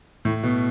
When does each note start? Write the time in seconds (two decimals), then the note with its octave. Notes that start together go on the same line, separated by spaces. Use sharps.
0.25 A2
0.43 B2